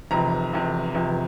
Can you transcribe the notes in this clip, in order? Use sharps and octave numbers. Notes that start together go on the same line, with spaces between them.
F1 E2 C3 F3 A#5
F1 E2 C3 F3
F1 E2 C3 F3